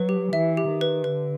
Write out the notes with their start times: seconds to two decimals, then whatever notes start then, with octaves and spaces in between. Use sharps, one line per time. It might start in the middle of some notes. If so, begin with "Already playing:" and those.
Already playing: F#3 B4
0.09 G4
0.33 E3 E5
0.57 G4
0.69 D#3
0.81 B4
1.04 D3 B4